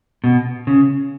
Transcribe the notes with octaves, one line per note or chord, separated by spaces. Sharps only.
B2
C#3